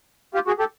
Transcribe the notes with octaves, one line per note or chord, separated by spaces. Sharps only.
F4 G4
F#4 G#4
G4 A4